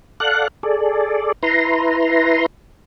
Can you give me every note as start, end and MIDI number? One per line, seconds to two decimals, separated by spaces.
0.20 0.48 69
0.20 0.48 74
0.20 0.48 77
0.20 0.48 78
0.20 0.48 90
0.63 1.32 68
0.63 1.32 69
0.63 1.32 74
1.43 2.46 64
1.43 2.46 71
1.43 2.46 82
1.43 2.46 84